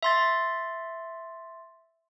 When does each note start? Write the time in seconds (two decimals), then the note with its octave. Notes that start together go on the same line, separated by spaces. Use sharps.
0.03 E5 C6 A6